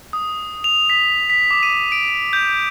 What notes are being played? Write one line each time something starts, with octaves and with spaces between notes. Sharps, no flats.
D#6
F7
B6
B6
D6
D#7
D7
B6
G6